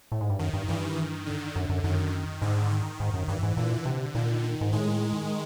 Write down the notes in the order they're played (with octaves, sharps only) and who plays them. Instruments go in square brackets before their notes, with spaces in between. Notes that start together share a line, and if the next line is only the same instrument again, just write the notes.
[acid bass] A2
G#2
G2
[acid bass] F#2 [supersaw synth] D#3
[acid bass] G2
[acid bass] G2 [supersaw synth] E3
[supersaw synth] D#3
D3
[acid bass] F#2 [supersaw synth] D3
[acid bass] F#2
[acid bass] F#2 [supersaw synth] D#3
[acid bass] G#2 [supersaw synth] D3
[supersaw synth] D#3
[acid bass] G#2
F#2
[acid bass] G2 [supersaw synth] E3
[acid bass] G#2
[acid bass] A#2 [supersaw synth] D3
[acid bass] C3
[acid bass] A#2 [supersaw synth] D#3
[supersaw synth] D#3
[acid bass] G#2
[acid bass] A2 [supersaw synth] G#3